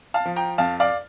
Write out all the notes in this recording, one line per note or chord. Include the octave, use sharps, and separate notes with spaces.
F5 A5
F3
G5 A#5
F2 F5 A5
D5 F5